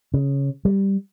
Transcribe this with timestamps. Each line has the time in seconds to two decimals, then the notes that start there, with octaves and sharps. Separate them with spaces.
0.14 C#3
0.65 G3